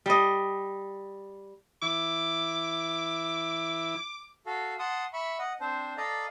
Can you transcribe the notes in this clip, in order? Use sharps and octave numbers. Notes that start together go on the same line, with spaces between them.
G3 D#5
E3 E4 D6
F#4 A4 F5
F#5 A5 C6 D#6
E5 B5 C#6
D#5 F#5
C4 D4 C5
A4 D5 D#5 F5 A#5